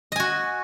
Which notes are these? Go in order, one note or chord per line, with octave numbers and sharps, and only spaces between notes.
F#4 D#5 G#5